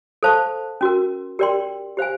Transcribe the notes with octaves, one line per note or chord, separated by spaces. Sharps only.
A4 C5 F5 A5 C#6
C#4 F#4 A#4
G4 A#4 D5 G5 C6
G4 C5 F5 G#5